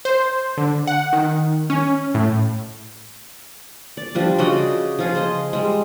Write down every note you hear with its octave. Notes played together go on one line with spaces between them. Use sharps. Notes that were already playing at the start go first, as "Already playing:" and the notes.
C5
D3
F#5
D#3
C#4
A2
D5
F3 G3 D4
C#3 F#4 D5 D#5
F3 F4 G#4
C5 D#5
G3 G#3